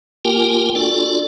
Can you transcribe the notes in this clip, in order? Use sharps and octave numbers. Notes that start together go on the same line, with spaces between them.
A#3 F4 G4 A#4 G5 G#5
D4 F4 F#4 A4 D5